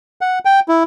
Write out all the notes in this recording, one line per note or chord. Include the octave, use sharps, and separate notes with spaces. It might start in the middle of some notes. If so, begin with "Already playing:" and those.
F#5
G5
E4